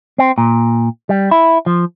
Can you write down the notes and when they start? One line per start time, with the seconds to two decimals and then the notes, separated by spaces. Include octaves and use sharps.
0.18 C4
0.38 A#2
1.09 G3
1.31 E4
1.66 F3